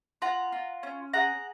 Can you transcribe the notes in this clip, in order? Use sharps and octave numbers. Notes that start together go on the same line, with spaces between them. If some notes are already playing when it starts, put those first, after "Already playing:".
F4 F#5 A#5
F4
C#4
G#4 F#5 A#5